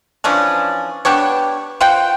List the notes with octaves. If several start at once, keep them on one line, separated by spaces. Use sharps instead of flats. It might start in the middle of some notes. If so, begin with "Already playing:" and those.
E3 F3 C#4 D4
B3 D4 G4 C#5
F4 C5 F#5 G5